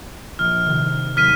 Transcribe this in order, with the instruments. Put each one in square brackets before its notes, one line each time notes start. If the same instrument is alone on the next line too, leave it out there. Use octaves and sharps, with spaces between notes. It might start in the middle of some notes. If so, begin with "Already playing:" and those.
[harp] A#1 [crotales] F6
[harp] C3 D#3
[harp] D#2 F#3 G3 [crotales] F6 B6 D#7